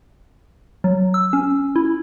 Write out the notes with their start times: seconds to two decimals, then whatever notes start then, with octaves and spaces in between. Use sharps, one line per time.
0.84 F#3
1.14 E6
1.33 C#4
1.76 E4